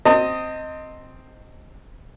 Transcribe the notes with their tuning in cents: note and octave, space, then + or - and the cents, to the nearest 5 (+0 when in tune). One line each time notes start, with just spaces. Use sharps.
C4 +0 D#5 +0 A5 +45